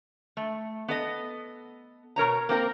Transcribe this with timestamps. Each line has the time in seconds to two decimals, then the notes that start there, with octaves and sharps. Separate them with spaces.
0.37 A3
0.88 B3 A4 D#5
2.16 B2 A#4 C#5 A#5
2.49 A#3 C4 F4 A#4